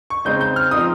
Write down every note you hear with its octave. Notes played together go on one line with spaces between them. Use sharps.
C#6
C#3 G#3 C4 D#4 G6
G6
F6
F3 C4 D#4 D#6